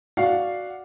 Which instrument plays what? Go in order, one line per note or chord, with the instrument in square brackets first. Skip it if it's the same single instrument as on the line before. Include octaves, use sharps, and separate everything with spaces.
[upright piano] F#4 D5 F5 F#5